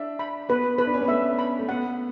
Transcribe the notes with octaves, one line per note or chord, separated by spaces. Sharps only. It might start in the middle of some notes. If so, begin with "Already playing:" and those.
Already playing: D4 E5
B5
B3 B4
B4
D4
C#4
B3
A3 E5
B5
A3
B3 F#5